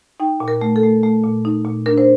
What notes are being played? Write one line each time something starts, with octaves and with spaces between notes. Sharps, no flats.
D#4 G5
A#2
A#4
A3
A4
A3
A3
A#2
D#4
A#2
D4 A#4
C5